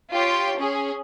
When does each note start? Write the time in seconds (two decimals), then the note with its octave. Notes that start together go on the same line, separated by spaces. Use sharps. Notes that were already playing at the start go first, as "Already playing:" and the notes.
0.11 F4 G4 C#5 G5 C6
0.57 C#4 G#4